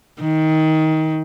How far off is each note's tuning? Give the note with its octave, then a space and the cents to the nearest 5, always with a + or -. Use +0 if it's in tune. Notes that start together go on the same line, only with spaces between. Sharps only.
D#3 +20